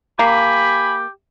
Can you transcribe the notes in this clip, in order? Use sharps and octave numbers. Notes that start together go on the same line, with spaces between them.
A#3 G4 G#5 B5